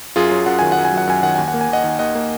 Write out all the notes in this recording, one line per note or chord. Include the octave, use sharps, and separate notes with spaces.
F#2 F4 G#4
F#3
F#2 F#5
D#3 G#5
F#5
F#2
G#5
F#3
F#5
F#2 G#5
D#3 F#5
D#2 G#5
F#5
A#3
G#5
D#2 D#5 F#5
D#3
G#5
D#2 D#5 F#5
A#3